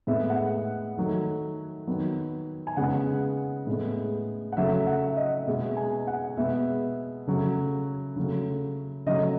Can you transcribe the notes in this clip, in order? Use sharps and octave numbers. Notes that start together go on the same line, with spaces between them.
A2 G#3 B3 E5
F#5
D#3 F#3 A3
D#3 F#3 B3
G#5
C#3 G#3 B3 F#5
A2 G#3 B3
F#5
C#3 F#3 A3 E5
F#5
E5
D#5
B2 G#3 B3 E5
G#5
F#5
B2 G#3 B3 E5
C#3 F#3 A3
C#3 F#3 A3
C#3 F#3 A3 D#5